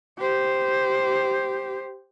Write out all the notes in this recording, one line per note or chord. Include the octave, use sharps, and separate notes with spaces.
G4 C5